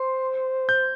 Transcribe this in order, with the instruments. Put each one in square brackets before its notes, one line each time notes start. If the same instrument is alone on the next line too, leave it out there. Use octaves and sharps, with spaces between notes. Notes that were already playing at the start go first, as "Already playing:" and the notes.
Already playing: [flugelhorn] C5 [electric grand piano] C6
[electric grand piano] G6